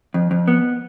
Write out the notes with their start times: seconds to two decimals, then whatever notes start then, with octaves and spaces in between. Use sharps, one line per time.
0.14 F2
0.31 F2
0.48 B3